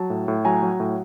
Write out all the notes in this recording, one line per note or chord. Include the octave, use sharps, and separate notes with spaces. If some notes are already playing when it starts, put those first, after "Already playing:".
Already playing: F#3 A5
A2
A2
F#3 G#5 A#5
F#3
A2